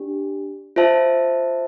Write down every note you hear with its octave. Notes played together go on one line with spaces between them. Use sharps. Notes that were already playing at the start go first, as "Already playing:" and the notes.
Already playing: D4 G4
F4 C5 E5 A5